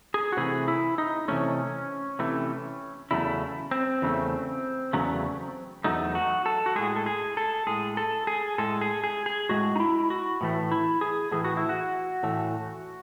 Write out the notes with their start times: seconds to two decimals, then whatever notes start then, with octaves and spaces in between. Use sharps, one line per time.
0.14 G#4
0.32 F#4
0.37 C3 E3 A3 G#4
0.68 E4
0.98 D#4
1.28 C3 E3 A3 C#4
2.19 C3 E3 A3
3.11 E2 C#3 F#3 A3 E4
3.71 C4
4.02 E2 C#3 F#3 A3
4.93 E2 C#3 F#3 A3
5.84 E2 C#3 F#3 A3 D#4
6.15 F#4
6.46 A4
6.66 F#4
6.75 A2 G#3 G#4
6.96 A4
7.06 G#4
7.37 A4
7.67 A2 G#3 G#4
7.97 A4
8.27 G#4
8.58 A2 G#3 A4
8.81 G#4
9.04 G#4
9.26 G#4
9.49 A2 G#3 F#4
9.76 D#4
9.80 E4
10.10 F#4
10.41 A2 E3 A3
10.72 E4
11.01 G#4
11.32 A2 E3 A3 G#4
11.44 F#4
11.57 E4
11.69 F#4
12.23 A2 E3 A3